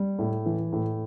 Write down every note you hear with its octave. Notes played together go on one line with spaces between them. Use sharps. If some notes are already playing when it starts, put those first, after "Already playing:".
Already playing: G3
A2
E3
A2